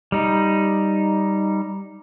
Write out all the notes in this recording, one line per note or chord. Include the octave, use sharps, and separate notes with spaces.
G3 D#4